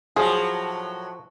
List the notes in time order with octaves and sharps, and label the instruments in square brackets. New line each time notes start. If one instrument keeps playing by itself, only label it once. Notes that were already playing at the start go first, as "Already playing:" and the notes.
[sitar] A2 F#3 [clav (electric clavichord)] F3 [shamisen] G#4